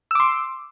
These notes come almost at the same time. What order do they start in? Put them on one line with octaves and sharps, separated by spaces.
E6 D6 C6